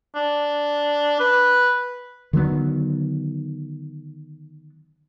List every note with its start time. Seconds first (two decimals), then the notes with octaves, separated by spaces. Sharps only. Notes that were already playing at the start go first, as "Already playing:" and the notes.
0.15 D4
1.20 B4
2.33 D3 D#3 F#3 B3